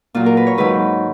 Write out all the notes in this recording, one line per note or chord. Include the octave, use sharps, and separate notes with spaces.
A#2 F#3 F4
A#4
B4
C#5
G#2 D#3 F#3 B4